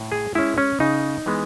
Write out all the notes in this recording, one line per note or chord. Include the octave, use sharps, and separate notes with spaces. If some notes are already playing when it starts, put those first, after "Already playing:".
Already playing: A2
G#4
G#3 C#4 E4
C#4
C#3 D#4
E3 G#3 B3